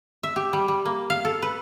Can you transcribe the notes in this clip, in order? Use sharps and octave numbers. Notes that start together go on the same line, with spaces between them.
E5
G4
G3
G3
A#3
F5
A4
B4